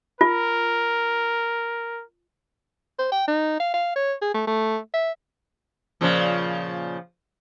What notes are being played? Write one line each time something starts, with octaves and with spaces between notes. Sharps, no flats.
F4 A#4
C5
G5
D#4
F5
F5
C#5
G#4
A3
A3
E5
A#2 C#3 F3